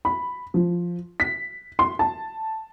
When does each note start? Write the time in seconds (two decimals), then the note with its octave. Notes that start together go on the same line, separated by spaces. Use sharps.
0.05 B5
0.54 F3
1.20 B6
1.79 C6
1.99 A5